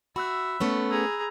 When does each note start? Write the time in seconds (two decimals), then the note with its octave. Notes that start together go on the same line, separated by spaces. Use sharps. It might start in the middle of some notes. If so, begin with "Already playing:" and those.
0.16 F#4 E5 B5 E6 F#6
0.60 A3 B3 C#4
0.91 G#4 A#5 E6